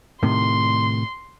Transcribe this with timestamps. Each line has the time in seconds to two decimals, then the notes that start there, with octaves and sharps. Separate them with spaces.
0.23 A2 C3 D#3 C6